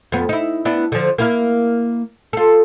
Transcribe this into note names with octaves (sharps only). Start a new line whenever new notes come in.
F2 B3
D#4 E4
B3 D4 E4
D3 F3
A#3 E4 A#4
F4 A4